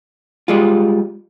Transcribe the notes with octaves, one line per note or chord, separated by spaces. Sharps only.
G3 G#3 F4